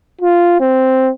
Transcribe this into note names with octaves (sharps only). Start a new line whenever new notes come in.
F4
C4